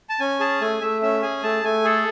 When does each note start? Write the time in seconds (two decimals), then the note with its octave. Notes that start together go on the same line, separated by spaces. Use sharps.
0.09 A5
0.20 C#4 G#5
0.40 G#4 A5
0.61 A3 G#5
0.81 A3 E5
1.02 C#4 E5
1.22 G#4 G#5
1.43 A3 A5
1.64 A3 G#5
1.85 G#4 A4